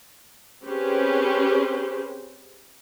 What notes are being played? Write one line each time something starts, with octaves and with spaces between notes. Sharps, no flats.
C4 C#4 G4 G#4 B4 C5